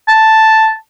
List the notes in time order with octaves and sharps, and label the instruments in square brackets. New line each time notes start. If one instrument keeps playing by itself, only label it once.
[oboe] A5